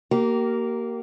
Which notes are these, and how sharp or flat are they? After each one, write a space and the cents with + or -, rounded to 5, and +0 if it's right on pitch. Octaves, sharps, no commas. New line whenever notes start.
A#3 -5 G4 -35 A#4 -5